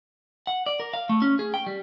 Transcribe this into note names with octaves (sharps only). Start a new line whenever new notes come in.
F#5
D5
A#4
F5
A3
C#4
G#4
G5
G3